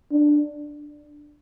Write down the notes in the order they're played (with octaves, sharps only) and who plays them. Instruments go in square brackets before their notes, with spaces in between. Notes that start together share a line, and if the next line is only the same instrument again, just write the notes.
[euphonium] D4